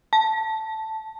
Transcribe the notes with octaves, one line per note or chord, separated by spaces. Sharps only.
A5